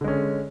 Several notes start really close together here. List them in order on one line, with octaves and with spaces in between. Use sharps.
D3 G#3 C#4